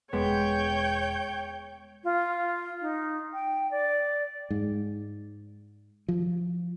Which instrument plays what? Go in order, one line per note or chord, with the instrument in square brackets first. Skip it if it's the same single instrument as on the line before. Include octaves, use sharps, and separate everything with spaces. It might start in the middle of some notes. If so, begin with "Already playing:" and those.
[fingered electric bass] E1 [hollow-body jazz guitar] G#3 B3 [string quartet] C#5 G5 G6
[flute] F4
D#4
G5
D5
[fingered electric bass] G#2
F3